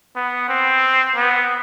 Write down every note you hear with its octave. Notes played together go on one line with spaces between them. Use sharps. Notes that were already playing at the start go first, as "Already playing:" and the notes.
B3
C4
B3